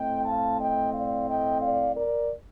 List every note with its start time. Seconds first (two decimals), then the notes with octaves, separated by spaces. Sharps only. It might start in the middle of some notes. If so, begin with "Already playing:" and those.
Already playing: A2 A3 C4 D#5 G5
0.24 F5 A5
0.58 D#5 G5
0.93 D5 F5
1.28 D#5 G5
1.61 D5 F5
1.95 A#4 D5